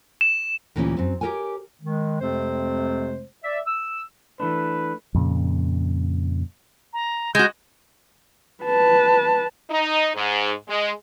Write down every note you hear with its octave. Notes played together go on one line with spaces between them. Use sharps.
E7
D2 A#2 E3 G3 B3 C#4
F#2 C4
G4 A4 A#4 C#5 G#5
D#3 G#3
F2 C3 G#3 A3 C4 C5
D5 E5
E6
E3 A3 D4 B4
F2 A#2 C#3
A#5
G#3 F#4 G6
B4 A5
D#4
G#2
G#3